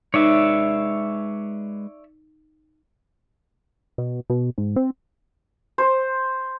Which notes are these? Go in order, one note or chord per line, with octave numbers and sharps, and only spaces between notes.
G#3 D#4 G#4 B4 C#5 D5 E5
B2
B2
G#2
C4
C5